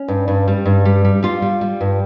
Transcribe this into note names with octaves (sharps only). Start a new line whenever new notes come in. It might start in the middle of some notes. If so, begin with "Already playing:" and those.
Already playing: C#4
G2
G2
G3
G2
G3
G3
G3 F4
G3
G3
G2